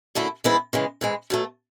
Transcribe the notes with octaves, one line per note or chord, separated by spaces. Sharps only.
F#2 D3 A3 E4
G#2 E3 G#3 B3 E4
C#3 E3 G#3
G#2 E3 G#3
B2 F#3 A3